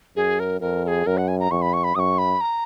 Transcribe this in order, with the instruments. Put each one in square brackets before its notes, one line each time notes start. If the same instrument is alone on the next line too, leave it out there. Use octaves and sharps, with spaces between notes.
[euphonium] F#2 [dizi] G#4
[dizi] A#4
[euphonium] F2 [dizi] A#4
[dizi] A#4
G#4
[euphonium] F#2 [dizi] A#4
[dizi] F#5
G#5
A#5
[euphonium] F2 [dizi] C#6
[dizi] B5
C#6
B5
[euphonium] F#2 [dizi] C#6 D#6
[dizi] B5
A#5